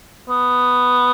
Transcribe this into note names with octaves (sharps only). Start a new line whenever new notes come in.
B3